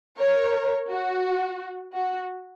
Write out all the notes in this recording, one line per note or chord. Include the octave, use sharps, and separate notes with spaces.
A#4 C#5
F#4
F#4